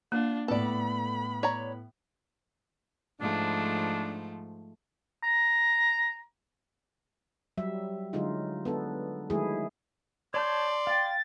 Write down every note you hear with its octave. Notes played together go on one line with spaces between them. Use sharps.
A#3 D4 F4
A2 B3 A4 D5 B5
C#5 D5 A#5
G#2 F3 A3 D4
A#5
F#3 G3 E5
D3 F#3 G#3 D#4 F4
B3 D4 A4
D#3 F#3 G#3 A3 E4 G#4
C#5 D5 A5 C6 G6
F5 G5 A6